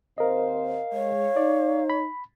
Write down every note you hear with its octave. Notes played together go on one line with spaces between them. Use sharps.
D#2 C4 A#4 C5 D#5 F5
G#3 C#5
D#4 D5
B5